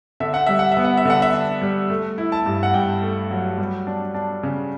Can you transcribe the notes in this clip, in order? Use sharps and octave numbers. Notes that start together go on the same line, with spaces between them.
D3 E5
F#5
G3 E5
F#5
E5
B3
F#5
E5
D3 F#5
E5
D4
G3
A3
E4
A5
G2
F#5
G2 G5
A3
F#3
G3
D4
D4
C#3